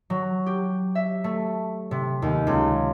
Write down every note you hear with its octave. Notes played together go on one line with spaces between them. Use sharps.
F#3
G4
E5
A3
C3
D#2
C#2